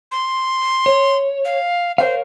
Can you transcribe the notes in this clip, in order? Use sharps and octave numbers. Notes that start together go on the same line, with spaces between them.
C6
C#5
F5
A#4 C5 C#5 F5